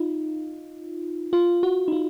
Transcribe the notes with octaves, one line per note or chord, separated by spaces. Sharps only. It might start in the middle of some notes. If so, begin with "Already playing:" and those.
Already playing: D#4 F4
F4
F#4
D#4
F4